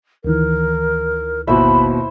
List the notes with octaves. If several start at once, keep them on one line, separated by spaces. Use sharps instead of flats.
D2 D#3 E3 A#4
G#1 D#2 B2 E4 F#4 C5 E5 B5